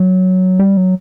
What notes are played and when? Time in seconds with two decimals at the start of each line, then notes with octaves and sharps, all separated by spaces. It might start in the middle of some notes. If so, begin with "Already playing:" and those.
Already playing: F#3
0.59 G3
0.77 F#3